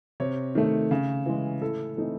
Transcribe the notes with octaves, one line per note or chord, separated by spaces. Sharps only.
C3 C#5
D#3 A3
C#3
E3 G#3
A2 A4
E3 A3 C4 D#4